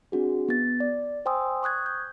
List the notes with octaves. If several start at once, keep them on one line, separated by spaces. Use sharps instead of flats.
C4 D4 F#4 G#4
B3 A6
D5
C5 G5 G#5 C6 D#6 E6
C#6 D#6 F#6 G#6
G6